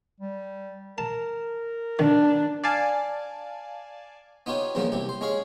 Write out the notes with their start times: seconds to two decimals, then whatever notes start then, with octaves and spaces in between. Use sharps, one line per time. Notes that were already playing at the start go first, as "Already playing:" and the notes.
0.20 G3
0.98 A#4 A5
1.99 D#3 D4
2.64 D5 F5 G#5 A5
4.46 B3 D#4 F4 G4 C#5
4.75 E2 G2 C#3 F3 A#3 B3
4.92 C2 C3 G4
5.09 C5
5.21 G#3 C#4 G#4 C#5 F5